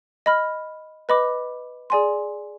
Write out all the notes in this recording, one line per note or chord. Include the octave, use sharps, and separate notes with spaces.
D#5 B5 F6
B4 D#5 B5 D6
G#4 D5 G#5 C6